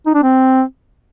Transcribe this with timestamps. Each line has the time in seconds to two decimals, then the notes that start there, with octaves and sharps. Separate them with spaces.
0.06 D#4
0.15 D4
0.23 C4